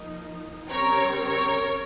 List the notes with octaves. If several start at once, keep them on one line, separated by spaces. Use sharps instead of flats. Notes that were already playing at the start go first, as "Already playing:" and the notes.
Already playing: F3 A#3 D#4
C#3 G3 C4 A#4 C#5
A#4 C#5